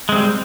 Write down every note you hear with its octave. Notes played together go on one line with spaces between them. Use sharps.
G3 G#3 C4